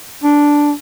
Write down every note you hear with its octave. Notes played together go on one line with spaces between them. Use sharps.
D4